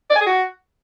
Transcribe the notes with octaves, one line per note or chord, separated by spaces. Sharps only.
D5
G#5
G#4
F#4